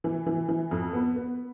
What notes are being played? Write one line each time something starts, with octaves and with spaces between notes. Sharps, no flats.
E3
E3
E3
F2
B3
B3